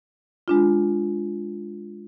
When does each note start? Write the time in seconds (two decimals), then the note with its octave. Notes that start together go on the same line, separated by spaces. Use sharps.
0.48 G#3 D4 F4